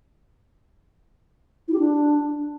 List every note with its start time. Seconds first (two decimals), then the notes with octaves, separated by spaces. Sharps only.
1.68 E4
1.73 G4
1.79 D4